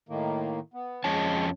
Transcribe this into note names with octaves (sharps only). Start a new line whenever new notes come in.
A2 D#3 A#3
B3
F2 G#3 C#4 C#5 A5